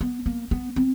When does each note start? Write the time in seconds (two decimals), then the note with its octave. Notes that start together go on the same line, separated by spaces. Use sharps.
0.01 B3
0.26 A#3
0.51 B3
0.76 C4